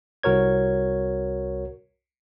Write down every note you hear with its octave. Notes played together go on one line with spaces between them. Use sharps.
C2 F#4 A#4 C#5 G#6